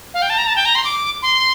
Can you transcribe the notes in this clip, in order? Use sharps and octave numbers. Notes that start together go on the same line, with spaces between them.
F5
G5
A5
A#5
A5
G5
A#5
C6
D6
C6